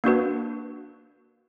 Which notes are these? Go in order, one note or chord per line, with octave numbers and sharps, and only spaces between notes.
A#3 D4 F#4 B4